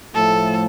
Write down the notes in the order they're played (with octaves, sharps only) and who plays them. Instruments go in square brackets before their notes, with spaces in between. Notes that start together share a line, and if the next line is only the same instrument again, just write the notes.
[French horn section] A2 F3 A3 [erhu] A4